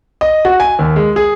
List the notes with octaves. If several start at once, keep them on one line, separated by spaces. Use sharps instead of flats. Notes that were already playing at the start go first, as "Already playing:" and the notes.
D#5
F#4
G#5
D#2
G#3
G#4